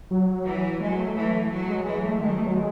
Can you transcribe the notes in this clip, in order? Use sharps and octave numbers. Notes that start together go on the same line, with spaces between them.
F#3
E3
F#3 G#3
A3
E3
F#3
G#3
E3 G#3
A3
D#3 G#3
F#3
A3
F#3
G#3